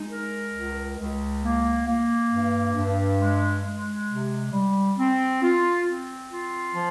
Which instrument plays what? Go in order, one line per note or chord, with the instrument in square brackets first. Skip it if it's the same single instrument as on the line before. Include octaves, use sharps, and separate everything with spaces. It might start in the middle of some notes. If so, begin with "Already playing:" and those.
Already playing: [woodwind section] G#3 D#4
A#4
C#2
C#2
A#3
A#3
G2
G2
G#3
G#3
C3
G3
C4
F4
C4
F4
F3